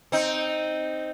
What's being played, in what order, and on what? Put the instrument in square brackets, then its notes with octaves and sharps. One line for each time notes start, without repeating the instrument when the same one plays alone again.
[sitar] C4 D#4